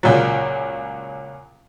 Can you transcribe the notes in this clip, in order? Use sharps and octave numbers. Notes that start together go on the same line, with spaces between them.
C#2 A#2 F#3